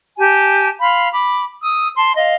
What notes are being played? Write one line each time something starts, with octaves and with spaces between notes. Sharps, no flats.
G4 G#5 A5
F5 B5 C6
B5 D6
D#6 E6
A5 C6
D#5 F5